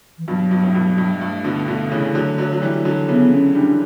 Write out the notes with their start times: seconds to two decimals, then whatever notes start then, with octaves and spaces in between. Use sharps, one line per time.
0.18 E3
0.28 G2 B2 F#3
0.51 G2 B2
0.63 A2
0.75 G2 B2
0.98 G2
1.11 G3
1.21 G2 A3
1.45 B2 D3
1.68 B2 D3
1.92 C#3 E3
2.15 D3 F#3
2.38 D3 F#3
2.52 F#3
2.62 E3 G3
2.85 D3 F#3
3.08 C#3 E3 B3
3.32 C#4
3.55 E3 G3 D4